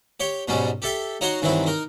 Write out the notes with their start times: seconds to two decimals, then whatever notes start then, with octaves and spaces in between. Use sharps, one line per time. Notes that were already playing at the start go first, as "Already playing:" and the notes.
0.20 G4 C#5 G5
0.48 G#2 B2 F#3 G3 C#4
0.82 G4 A4 E5 G5
1.21 D#4 F#4 C#5 F#5 A#5 C6
1.42 G2 D#3 E3 F#3 C4 E4
1.66 D#4 A#4